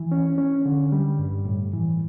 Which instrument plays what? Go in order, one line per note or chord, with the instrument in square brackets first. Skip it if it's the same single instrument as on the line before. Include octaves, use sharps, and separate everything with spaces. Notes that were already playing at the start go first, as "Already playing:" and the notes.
Already playing: [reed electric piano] E3
C#4
C#4
D3
G3
G2
A2
E3